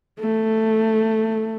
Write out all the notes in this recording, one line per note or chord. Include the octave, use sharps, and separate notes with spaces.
A3